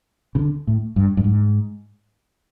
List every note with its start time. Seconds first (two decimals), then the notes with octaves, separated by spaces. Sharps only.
0.35 C#3
0.39 D3
0.67 A2
0.96 G2
1.17 G2
1.24 G#2